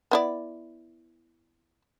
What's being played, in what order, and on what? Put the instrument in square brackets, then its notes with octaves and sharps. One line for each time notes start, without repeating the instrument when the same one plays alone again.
[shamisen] B3 E4 D5